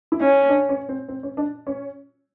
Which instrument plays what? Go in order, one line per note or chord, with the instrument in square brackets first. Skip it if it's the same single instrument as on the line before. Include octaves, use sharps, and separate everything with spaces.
[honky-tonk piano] E4
[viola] C#4 [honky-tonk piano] D#4
[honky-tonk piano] D4
C#4
C4
C4
C#4
D4
C#4